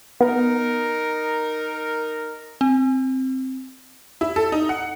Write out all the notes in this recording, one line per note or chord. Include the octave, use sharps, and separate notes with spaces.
B3 D#4 A#4
C4
E4
A4
D#4
F#5